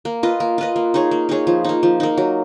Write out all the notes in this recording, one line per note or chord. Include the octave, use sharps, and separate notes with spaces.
A#3
F4 B4 D#5
A#3
F4 B4 D#5
A#3
D#4 G#4 C#5
A#3
D#4 G#4 C#5
F3
A#3 D#4
F3
A#3 D#4
F#3